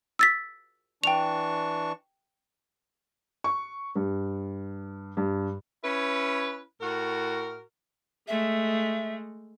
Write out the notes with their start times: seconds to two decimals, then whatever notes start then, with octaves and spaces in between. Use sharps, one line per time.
0.19 E6 A6 B6
1.04 E3 D4 G5 C#6 F7
3.44 C#6
3.95 G2
5.17 G2
5.84 C#4 E4 B4
6.81 A2 F#4 A#4
8.28 G#3 A3 E5